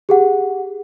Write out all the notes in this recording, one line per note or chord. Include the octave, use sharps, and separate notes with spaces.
G4 G#4 F#5